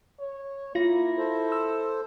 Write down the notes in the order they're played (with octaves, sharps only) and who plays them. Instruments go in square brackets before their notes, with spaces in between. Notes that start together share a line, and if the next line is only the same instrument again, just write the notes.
[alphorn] C#5
[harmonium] A#3 [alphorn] E4 [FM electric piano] F4 A#6
[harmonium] A4 C5
[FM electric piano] E6